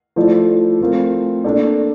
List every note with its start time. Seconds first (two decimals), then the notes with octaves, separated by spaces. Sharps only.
0.16 F3 A3 E4 A4 D5
0.80 F3 A3 C4 F4 A#4
1.44 A#3 D4 A4 D5